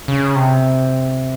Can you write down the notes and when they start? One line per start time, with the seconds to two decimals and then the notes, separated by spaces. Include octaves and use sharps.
0.08 C#3
0.36 C3